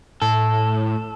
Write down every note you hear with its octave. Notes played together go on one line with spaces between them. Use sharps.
A2 A4